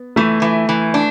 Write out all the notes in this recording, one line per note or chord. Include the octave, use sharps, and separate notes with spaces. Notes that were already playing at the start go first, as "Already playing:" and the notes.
Already playing: B3
E3 A3
E3
E3
D4